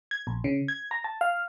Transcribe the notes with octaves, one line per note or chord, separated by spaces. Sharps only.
G#6
A#1
C#3
G#6
A#5
A5
F5